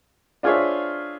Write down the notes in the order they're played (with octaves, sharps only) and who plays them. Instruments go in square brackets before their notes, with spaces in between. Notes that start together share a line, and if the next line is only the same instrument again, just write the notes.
[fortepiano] D4 F4 G#4 C5 C#5 E5